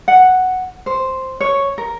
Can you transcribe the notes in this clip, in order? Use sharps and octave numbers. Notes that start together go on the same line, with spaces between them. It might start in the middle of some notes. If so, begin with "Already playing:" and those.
F#5
C5
C#5
A#4